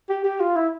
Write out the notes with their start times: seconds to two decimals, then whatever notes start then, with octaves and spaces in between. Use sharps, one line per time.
0.09 G4
0.24 G4
0.40 F4
0.56 E4